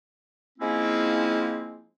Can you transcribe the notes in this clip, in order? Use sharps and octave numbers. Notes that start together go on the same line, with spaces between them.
F3 G#3 A#3 C4 C#4 E4